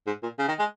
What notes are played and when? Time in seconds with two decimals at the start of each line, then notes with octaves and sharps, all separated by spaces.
0.07 G#2
0.23 A#2
0.39 C#3
0.48 D#3
0.59 G#3